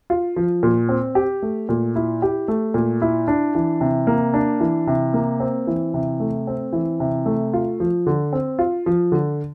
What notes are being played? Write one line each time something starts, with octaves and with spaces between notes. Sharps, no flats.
F4
F3
A#2
C4
G4
A3
A#2
E4
G4
A3
A#2
E4
D4
E3
C3
A#3
D4
E3
C3
A#3
C4
E3
C3
A3
C4
E3
C3
A3
F4
F3
D3
C4
F4
F3
D3